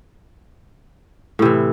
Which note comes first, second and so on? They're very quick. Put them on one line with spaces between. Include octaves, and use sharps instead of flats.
A2 C3 E3